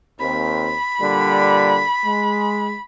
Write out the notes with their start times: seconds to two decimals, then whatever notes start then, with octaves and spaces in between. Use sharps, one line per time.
0.20 D#2 C4 B5
1.00 A#2 D3 G3
2.05 G#3